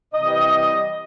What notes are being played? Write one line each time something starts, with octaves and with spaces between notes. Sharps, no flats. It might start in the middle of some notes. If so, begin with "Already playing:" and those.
C3 E3 G3 D#5